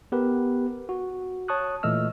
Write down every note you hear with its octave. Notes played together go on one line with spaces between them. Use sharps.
B3 G4 A#4 B4
F#4
C#5 A5 C#6 D#6 F#6
A#2 E3 A3 D#5 E6 F6